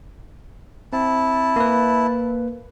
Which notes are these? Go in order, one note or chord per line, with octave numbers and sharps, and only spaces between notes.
C4 E4 A5
A#3 B4